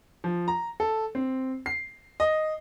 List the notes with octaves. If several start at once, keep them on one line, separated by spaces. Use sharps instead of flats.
F3
A#5
A4
C4
C7
D#5